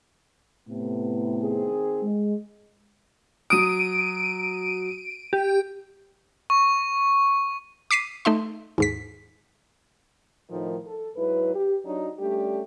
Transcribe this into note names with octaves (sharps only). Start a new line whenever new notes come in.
A2 C3 B3
D#3 C4 G#4
G#3
F#3 D#6 D7 D#7
G4
C#6
D6 B6 C7 D#7
A3 D#4 E5 C6
D#2 G#2 B6
A2 D#3 F3
A4
G#2 F#3 E4 B4
G4
F#3 D4 D#4
G3 A3 C#4 D4 G4